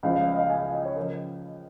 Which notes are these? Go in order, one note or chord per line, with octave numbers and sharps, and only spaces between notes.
C#2 C#3 F3 F5
F5
F5
D#5
F5
G#5
F5
D#5
C#5
C#3 F3 A#4